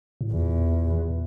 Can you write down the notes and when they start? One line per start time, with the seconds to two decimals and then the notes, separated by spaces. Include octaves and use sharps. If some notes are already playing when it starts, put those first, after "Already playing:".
0.21 A2
0.32 E2 A#2